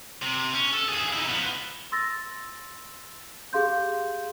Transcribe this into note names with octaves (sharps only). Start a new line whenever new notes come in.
C3
C#4
A4
D#2 G#4
D#4 E4
F3 B3
C6 E6 A6 A#6
G4 G#4 F5 C6 G6